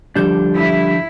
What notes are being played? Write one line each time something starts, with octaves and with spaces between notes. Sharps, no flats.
D3 F3 G3 D4 G4 G6
E4